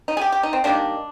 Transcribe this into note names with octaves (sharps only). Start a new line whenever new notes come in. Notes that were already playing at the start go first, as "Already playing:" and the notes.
D#4
G#4
G4
G4
D#4
C4
D#3 G3 A#3 D4